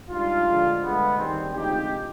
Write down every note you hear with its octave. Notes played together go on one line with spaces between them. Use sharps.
G#2 G3 D4 F4
D2 D3 F3 G#3
G2 D3 G#3 B3
D#2 D#3 G3 C4
D2 C3 F3 G#3 D#4 G4